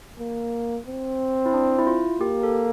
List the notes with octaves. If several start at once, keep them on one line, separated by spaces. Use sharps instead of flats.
A#3
C4
E4
D4
E4
F4
A#3 G4
A4